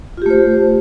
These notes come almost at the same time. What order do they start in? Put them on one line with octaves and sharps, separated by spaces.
F4 G4 A3 C5